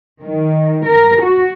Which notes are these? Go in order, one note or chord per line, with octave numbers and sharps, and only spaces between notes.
D#3
A#4
F#4